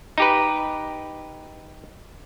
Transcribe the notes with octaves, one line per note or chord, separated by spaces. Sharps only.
D#4 G4 B4